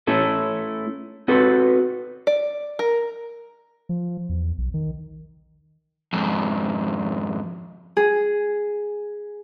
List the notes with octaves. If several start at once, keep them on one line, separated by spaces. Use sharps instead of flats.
A3 C#4 E4 A4
C4 F#4 A4 B4
D5
A#4
F3
E2
B1
D#3
F2 G#2
G#4